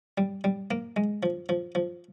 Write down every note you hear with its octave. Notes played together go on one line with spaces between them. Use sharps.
G3
G3
A#3
G#3
F3
F3
F3